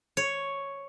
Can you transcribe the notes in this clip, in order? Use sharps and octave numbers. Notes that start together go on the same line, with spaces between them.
C#5